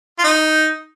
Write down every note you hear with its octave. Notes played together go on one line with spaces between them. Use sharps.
F4
D#4